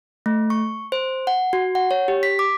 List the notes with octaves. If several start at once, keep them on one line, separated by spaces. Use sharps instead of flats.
A3
C#6
C5
F#5
F#4
F#5
C#5
G4
B6
D6